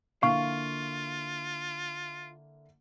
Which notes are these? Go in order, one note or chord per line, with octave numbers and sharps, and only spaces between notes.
D3 A#3 E4 F4 F5 C#6